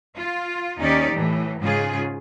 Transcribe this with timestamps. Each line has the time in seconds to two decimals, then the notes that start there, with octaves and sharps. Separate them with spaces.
0.18 F4
0.80 D#2 C#4 D#4 G4 D5
1.12 A2 E3
1.61 G#2 C#3 F4 G#4